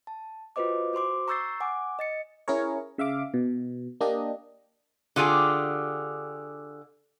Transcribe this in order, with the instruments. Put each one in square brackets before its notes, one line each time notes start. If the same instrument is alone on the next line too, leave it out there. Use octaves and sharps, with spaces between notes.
[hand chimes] A5
F4 F#4 B4 C5 D#5 D6
F#4 C5 C6 D6
A#5 C#6 E6 G6 A6 C7
F#5 G#5 D6
D#5 A6 C#7
[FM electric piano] C#4 E4 G#4 A#4 C#5
C#3 E5 F5 D6
B2
A#3 D4 G4 D#5
[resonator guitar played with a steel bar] D3 F4 G4 G#4